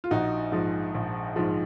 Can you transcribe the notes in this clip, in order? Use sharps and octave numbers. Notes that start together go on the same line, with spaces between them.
F4
A#1 D#4 F#4
G#2 F3
A#1
G#2 F3